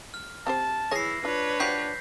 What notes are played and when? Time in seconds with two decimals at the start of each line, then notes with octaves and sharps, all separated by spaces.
0.14 F6
0.47 C4 G4 C5 A5
0.91 E3 E4 G#4 C#5 A#6 C7
1.25 D4 F4 B4 C#5
1.60 F3 F#4 G4 G6 B6 C7